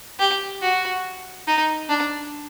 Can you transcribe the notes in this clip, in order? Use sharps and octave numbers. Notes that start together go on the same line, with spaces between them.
G4
F#4
D#4
D4